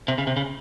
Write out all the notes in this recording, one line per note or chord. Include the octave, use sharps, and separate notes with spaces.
C3
C#3
C3
C#3